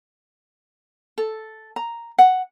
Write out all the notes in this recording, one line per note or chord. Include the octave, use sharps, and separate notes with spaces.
A4
A#5
F#5